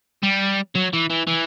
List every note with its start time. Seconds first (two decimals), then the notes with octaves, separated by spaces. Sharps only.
0.23 G3
0.75 F#3
0.93 E3
1.10 E3
1.27 E3